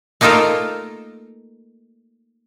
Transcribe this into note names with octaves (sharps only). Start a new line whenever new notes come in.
A3 A#3 D#4 F4 A4 A#4